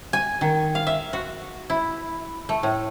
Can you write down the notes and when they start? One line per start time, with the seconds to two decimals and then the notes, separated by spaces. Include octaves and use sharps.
0.13 G#5
0.41 D#3
0.75 F5
0.87 E5
1.13 F#4
1.70 E4
2.49 A3
2.63 A2